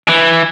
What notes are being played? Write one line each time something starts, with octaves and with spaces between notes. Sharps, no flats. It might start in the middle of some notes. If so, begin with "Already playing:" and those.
E3